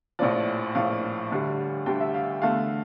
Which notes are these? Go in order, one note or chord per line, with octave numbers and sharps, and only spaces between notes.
A#1 A2 F3 D5
A#1 A2 F3 F5
D2 D3 G3
D2 D3 G3 G5
E5
F5
E2 D3 A3 F5